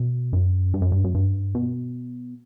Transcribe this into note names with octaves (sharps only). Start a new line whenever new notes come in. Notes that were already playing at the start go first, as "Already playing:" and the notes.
Already playing: B2
F#2
G2
F#2
G2
F#2
G2
B2